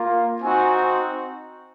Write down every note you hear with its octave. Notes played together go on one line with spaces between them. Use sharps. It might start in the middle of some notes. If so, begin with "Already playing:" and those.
Already playing: A#3 F4
C4 D#4 F#4 G#5